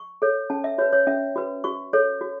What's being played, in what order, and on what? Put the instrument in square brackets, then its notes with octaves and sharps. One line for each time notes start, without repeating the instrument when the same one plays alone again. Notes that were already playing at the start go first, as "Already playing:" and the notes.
Already playing: [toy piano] C#6
A4 C#5
C#4 A5
E5
F#4 B4 C#5
C#5
C#4 E5
F#4 B4
F#4 C#6
A4 C#5
F#4